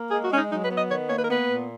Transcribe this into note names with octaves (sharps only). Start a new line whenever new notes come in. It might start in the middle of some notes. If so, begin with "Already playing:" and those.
Already playing: A#3
G#3 G#4
F#4
G#3 C#4
D#4
F#3 D#4
B4
B3
D#5
D#3 C#5
A#3 C#5
B4
A#4
B3 B4
A#2